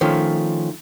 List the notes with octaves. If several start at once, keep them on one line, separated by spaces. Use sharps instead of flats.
D#3 F3 A3 C#4